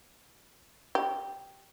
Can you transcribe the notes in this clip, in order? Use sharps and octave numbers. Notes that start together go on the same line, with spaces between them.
G4